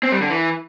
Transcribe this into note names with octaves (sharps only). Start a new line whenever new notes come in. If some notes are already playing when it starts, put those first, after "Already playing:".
C4
G3
D3
E3